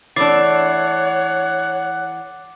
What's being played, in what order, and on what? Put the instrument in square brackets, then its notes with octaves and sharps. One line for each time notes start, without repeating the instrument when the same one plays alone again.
[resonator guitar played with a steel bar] E3 A3 D4 [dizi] C#5 [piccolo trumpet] F#5 [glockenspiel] D6 A6 C7